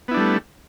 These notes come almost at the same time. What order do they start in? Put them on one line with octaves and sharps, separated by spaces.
B3 E4 D4 G3 A3